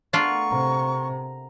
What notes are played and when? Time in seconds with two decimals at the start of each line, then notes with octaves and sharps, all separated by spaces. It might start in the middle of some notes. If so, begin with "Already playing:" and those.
0.13 A3 B3 D4 F4 A#4 C#6
0.51 C3 A#5